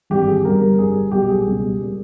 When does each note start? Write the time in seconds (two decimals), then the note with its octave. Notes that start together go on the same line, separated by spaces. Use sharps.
0.10 G#1 G2 E3 G3 G4
0.27 G#4
0.44 G1 G2 G3 A#4
0.78 G1 G2 G3 G#4
1.11 B1 A#2 G3 G4
1.29 G#4
1.46 C#2 B2 G3
1.80 A#2 G3